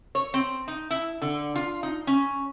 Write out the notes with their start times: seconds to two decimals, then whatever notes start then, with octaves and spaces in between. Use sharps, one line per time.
0.15 C#5
0.34 C4
0.68 D#4
0.90 E4
1.22 D3
1.56 F4
1.83 D#4
2.07 C#4